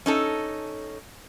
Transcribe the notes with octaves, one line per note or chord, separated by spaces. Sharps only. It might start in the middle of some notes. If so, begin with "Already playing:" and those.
C#4 D#4 A4